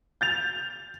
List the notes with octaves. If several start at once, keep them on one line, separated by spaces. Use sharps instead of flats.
G6 A6 F7